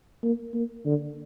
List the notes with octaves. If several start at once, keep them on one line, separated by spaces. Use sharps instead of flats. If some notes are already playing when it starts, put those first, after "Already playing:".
A#3
A#3
D3